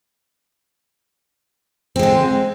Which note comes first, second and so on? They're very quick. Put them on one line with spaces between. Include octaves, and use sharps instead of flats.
C4 G#3 D3